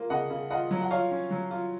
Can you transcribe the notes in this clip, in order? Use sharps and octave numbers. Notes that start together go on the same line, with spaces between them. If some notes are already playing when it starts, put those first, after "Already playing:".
Already playing: A#3 F4
C#3 D#5 F#5
C#3
F4 D#5 F#5
F#3
F#5
F4 C#5 F5
C#4
F#3
F4